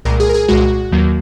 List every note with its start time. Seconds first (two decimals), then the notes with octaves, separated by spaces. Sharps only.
0.05 C2 A#2 G#3 A#4
0.20 G#4
0.29 A#4
0.34 G#4
0.48 C2 A#2 G#3 F#4
0.92 D#2 D#3 F#3 A#3